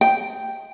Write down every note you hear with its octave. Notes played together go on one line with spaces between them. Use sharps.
G5